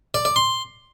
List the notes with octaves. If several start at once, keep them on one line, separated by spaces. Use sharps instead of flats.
D5
D5
C6